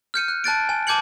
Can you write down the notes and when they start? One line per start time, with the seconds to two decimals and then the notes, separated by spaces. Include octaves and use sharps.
0.14 F6 G6 C#7 D#7
0.28 F#6
0.44 A5 F#6 A6 D7
0.69 G#5
0.87 A5 D6 G6 G#6 C#7 F#7